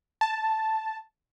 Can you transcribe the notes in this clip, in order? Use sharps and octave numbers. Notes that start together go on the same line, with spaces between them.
A5